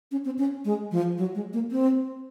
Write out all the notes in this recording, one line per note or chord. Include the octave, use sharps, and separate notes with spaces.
C#4
C4
C#4
G#3
F3
F#3
G#3
A#3
C4